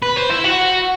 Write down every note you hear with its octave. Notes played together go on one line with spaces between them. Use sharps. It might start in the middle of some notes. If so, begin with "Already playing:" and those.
B4
C5
E4
F#4